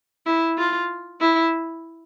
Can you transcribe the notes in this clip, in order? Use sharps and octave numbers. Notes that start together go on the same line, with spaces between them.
E4
F4
E4